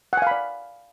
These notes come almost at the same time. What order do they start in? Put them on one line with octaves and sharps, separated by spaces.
F#5 G#5 F5 B5 D5